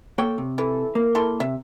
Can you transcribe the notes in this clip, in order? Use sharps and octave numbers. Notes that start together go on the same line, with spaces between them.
A#3 A4 C#5 G5
C3
E3 A4
A#3 A#4
E4 A4 C6
C3 E5